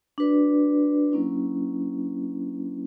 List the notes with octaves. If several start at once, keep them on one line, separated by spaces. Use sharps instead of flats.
D4 F#4 B4 D5
F#3 A#3 C#4 E4